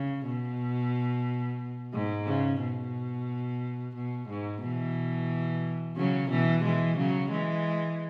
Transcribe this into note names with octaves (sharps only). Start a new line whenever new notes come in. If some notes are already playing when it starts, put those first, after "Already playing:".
Already playing: C#3
B2
G#2
C#3
B2
B2
G#2
B2 E3
C#3 F#3
B2 E3
E3 G#3
C#3 F#3
E3 G#3